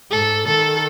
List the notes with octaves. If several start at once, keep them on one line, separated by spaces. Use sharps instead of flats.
G#2 A4
D#3 A4